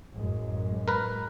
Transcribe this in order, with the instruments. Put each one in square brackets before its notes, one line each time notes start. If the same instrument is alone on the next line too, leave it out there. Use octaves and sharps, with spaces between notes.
[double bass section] A1 F#2 G#3
[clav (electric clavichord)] A#4 B4